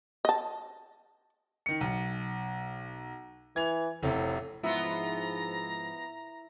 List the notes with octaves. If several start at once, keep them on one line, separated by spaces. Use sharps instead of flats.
D#5 A5
D#3 C#7
B1
E3 G#6 F7
F1 A2 C3
G#2 F3 B3 E4 F4 A#5